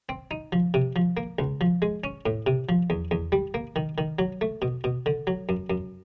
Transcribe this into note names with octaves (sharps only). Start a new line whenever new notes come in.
C4
D#4
F3
C3
F3
A#3
C#2
F3
G#3
C#4
A2
C3
F3
E2
E2
G3
A#3
D#3
D#3
F#3
A3
B2
B2
D3
F#3
F#2
F#2